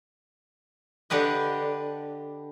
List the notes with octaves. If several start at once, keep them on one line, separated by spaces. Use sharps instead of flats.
D3 D4 G4 B4 D#5